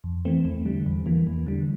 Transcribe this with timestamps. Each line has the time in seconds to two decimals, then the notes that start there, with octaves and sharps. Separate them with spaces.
0.04 F2
0.25 E3 A3 C4
0.45 E2
0.65 D3 G3
0.86 E2
1.06 E3 A#3
1.27 E2
1.47 D3 G3